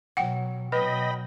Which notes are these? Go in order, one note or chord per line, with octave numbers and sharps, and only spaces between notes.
B2 F#3 F#5 G5
B2 F#3 B4 D#5 G5 B5